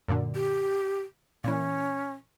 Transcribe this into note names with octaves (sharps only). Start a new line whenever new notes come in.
F#2 A#2 D3
G4
A#2 E3 C#4